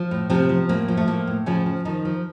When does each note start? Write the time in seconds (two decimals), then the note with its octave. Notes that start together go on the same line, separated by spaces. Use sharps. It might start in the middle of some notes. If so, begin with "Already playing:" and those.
Already playing: F3
0.11 A2
0.29 C3 F3 C4
0.49 F3
0.69 A2 A#3
0.88 F3
0.97 A3
1.07 A2 A#3
1.27 A2
1.46 C#3 F3 C#4
1.66 F3
1.85 D#3 F3 D#4
2.05 F3